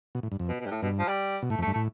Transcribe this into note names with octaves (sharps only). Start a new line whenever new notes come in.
B2
A2
G2
F2
B2
B2
G2
A2
G2 B2
F3
G3
B2
A2 A3
F2
A3
G2
A2 A3